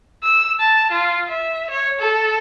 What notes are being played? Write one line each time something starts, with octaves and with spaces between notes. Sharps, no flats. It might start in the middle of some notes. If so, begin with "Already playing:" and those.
E6
A5
F4
E5
C#5
A4